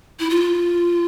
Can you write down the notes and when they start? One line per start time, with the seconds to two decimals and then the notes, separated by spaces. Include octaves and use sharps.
0.20 E4
0.30 F4